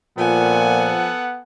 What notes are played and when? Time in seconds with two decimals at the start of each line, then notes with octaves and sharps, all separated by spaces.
0.18 A#2 F3 B3 A4 F#5 G#5